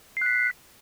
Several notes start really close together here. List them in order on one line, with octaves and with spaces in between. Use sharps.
C7 F#6 B6